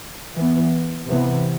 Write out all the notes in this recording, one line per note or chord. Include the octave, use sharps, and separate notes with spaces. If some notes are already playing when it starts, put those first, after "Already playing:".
E3 B3
C3 E3 B3